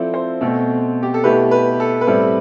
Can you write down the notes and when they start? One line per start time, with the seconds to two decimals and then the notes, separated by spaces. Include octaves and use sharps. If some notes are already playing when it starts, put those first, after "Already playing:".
Already playing: F3 C4 E4 A4 C5 D5
0.14 C5
0.41 B2 A3 C4 A4
1.03 G4
1.14 A4
1.24 B2 A3 E4 G4 B4
1.51 B4
1.80 A4
2.01 B4
2.07 A2 G3 C4 E4 A4